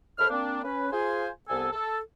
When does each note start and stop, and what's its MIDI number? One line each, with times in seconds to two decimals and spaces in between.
0.18 0.29 39
0.18 0.29 69
0.18 0.29 72
0.18 0.29 83
0.18 0.29 89
0.30 0.62 58
0.30 0.62 60
0.30 0.62 62
0.64 0.87 61
0.64 0.87 71
0.92 1.27 65
0.92 1.27 68
0.92 1.27 72
0.92 1.27 80
1.49 1.69 36
1.49 1.69 59
1.49 1.69 69
1.49 1.69 80
1.72 1.99 69